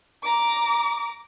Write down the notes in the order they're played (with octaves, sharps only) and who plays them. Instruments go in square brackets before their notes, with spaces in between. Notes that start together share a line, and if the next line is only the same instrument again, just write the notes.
[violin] A#5 D6